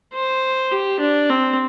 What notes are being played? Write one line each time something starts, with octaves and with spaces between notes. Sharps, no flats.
C5
G4
D4
C4